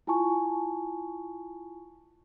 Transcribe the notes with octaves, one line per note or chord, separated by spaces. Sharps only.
E4 F4 G#5 A5 C#6